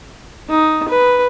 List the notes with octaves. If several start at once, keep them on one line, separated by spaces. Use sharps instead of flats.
D#4
B4